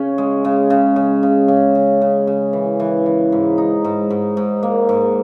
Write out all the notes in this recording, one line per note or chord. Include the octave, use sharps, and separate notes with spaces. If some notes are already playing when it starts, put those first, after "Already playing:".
Already playing: C#3 C#4
G#3
C#3
C#3
C#3
C#3
C#3
C#3
C#3
C#3
E3
E3
E3
G#2
D#4
G#2
G#2
G#2
A#3
G#2